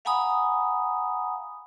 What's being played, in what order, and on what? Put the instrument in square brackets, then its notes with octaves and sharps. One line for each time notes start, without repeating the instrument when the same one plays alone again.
[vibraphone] F5 F#5 G#5 A#5 B5 D#6